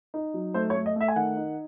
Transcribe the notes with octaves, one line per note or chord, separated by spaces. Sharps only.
D#4
F#3
A3 C5
C#5
A3
D#5
A3 E5
G#5
D#3 F#5
D#4